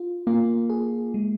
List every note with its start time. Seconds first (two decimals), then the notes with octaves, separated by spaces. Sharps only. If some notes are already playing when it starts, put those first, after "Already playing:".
Already playing: F4
0.27 A#3 F4
0.70 G#4
1.14 G#3